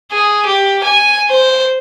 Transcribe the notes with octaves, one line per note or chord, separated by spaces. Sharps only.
G#4
G4
G#5
C5